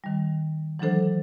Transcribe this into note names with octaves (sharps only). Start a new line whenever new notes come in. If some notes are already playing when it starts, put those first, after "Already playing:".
D#3 G3
E3 F#3 G#3 D4 A4 C5